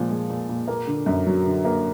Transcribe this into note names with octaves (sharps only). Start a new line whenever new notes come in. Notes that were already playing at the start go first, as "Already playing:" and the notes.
Already playing: A#2 F3 G#3
G#3
A#2
A#2
A#3
D3
F#2
F#3
D3
A#3